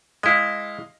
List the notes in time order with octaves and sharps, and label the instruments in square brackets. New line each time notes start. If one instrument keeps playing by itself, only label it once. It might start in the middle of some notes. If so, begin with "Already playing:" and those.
[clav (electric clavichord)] G#3 E4 [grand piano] D#5 F5